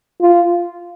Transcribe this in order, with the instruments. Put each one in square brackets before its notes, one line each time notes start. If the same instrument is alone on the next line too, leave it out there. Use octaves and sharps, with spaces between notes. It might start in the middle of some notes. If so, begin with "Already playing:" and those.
[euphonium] F4